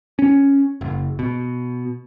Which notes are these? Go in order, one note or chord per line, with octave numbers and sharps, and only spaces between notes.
C#4
F#1
B2